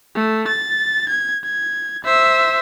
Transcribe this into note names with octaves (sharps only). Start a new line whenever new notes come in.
A3
A6
G#6
G#6
C5 E5